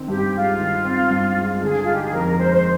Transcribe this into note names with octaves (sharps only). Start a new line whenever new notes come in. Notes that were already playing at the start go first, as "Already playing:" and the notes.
Already playing: D#3 C4
G2 G4
G#3 F4
D#3
C4
G2
G#3
D3 G#4
F4
D#4
G4
G#4
F2 A#4
G#3 C5
C5